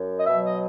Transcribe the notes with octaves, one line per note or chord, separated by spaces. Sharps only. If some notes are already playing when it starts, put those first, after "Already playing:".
Already playing: F#2
D#5
B2 F#3 E5
D#5